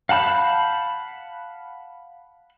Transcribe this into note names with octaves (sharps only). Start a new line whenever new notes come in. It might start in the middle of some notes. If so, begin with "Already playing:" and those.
F5 F#5 A5 B5 G6